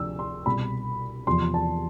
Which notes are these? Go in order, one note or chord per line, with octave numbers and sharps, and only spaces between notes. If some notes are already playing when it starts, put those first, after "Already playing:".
Already playing: D2 C3 F3 E6
C6
C2 B2 B5
E2 C3 F3 C6
A5